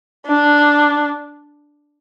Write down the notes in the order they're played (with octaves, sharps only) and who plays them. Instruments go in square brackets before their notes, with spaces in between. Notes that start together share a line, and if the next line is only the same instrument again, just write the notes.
[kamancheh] D4